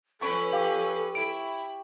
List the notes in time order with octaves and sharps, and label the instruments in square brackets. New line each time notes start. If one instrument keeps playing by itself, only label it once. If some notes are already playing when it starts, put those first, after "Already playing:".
[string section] F3 C#4 B4 [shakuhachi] A4 [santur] B5 C#6
[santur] G4 [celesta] F5 D6
[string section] E4 [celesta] D7